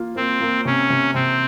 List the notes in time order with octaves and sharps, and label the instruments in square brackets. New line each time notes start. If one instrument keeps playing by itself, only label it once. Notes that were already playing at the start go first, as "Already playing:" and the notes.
Already playing: [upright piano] A#3 F4
[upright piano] A#3 [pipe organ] C4
[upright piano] A#3
[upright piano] C3 [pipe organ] C#4
[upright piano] C3
[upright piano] C3 [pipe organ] C4